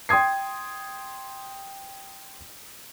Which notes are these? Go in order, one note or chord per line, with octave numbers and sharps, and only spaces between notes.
G5 C6 D#6 G#6 C7